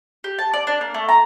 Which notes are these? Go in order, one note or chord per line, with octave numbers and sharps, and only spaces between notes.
G4
A5
D5
D4
A#3
A3
A#5